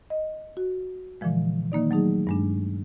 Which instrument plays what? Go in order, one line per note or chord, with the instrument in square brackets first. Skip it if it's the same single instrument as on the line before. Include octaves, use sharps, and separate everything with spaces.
[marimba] D#5
F#4
A#2 D3 E3 F3 G#3
D#3 A#3 D#4 D5
F#3 A3 D#4 G#4
G2 G#3 D4